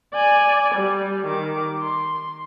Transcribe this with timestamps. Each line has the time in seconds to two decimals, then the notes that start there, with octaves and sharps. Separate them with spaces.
0.14 D5 G#5
0.75 G3
1.27 D#3 D6
1.82 C6